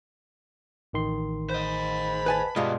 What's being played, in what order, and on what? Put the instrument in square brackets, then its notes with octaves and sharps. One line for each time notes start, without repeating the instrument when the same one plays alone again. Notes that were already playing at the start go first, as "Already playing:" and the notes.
[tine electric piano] A1 D#3 C6
[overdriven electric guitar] C5 D#5 [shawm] B5
[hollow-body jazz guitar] B4 G#5 A5
[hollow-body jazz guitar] G2 G#3 F4 [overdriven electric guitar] B2 [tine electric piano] D#5